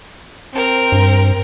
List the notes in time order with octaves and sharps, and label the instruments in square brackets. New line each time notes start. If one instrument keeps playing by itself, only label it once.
[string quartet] C4 A#4
[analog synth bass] G2